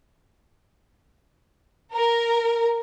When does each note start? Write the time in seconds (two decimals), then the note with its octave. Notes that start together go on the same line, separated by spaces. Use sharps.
1.94 A#4